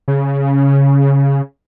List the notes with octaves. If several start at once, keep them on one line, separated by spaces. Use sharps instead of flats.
C#3